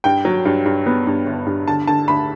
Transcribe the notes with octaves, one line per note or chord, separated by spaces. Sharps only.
G2 G5
F#3
G2
G2
B3
G2
G1
G2
D3 A5
D3 A5
D2 B5